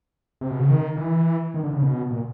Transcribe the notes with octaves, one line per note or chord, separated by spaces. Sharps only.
C3
B2
C#3
D#3
E3
D#3
D3
C#3
B2
A#2